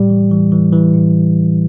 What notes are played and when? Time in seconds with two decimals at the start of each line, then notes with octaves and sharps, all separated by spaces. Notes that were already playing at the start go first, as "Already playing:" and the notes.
Already playing: A2 G3
0.09 E3
0.31 E3
0.52 E3
0.73 E3
0.94 A2